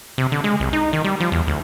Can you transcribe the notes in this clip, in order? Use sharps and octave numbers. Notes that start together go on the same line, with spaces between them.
C3
D3
G#3
C2
D#4
D#3
G3
F3
E2
D2